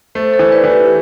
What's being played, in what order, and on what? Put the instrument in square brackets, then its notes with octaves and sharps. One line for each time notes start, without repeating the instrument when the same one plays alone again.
[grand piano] A3 [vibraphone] A4 C5
[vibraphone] A4 C5
[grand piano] E3
[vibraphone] B4 D5
[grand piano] E3
[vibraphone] G4 B4
G4